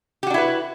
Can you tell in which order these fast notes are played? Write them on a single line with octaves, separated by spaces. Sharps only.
G4 F#4 D4 E4 B4